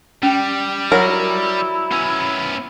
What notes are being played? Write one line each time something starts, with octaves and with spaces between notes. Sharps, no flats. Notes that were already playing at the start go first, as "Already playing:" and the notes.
G3 C#4 G5
F#3 E4 A#4
B3 C#4